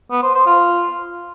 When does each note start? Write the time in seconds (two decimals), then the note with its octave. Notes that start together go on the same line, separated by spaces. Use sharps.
0.11 B3
0.23 C5
0.35 C5
0.46 F4